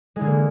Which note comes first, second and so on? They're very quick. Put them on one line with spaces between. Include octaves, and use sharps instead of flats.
G#3 E4 D3 E3 A#3